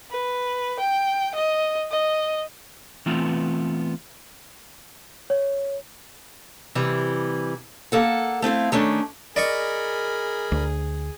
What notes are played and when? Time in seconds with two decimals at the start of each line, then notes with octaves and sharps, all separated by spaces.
0.11 B4
0.80 G5
1.35 D#5
1.91 D#5
3.06 E3 A3 B3 C4 F4
5.30 C#5
6.75 C3 E3 G3
7.92 A#3 A4 F#5
8.42 A3 C4 E4 F5
8.72 D#3 A3 C#4 D4
9.36 G#4 A#4 D5 D#5 B5 C#6
10.52 D2